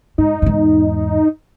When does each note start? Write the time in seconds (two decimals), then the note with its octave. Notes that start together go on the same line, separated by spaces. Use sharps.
0.18 G#2 D#4
0.42 E2 G#2